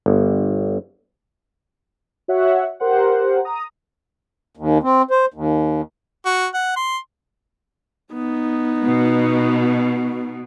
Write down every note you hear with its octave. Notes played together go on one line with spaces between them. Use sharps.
G1
F#4 C#5 E5 F#5
G4 A#4 C5 F#5
A#5 D#6
D#2
C4
C5
D#2
F#4
F#5
C6
B3 D#4
B2